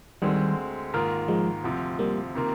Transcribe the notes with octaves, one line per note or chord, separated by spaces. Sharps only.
D2 D3 D#3 G3 G#3 C4
G#2 D#3 A#3 F4 A#4
F3 G#3
D2 C3 F3
G3 A#3
C3 D#3 A#3 F4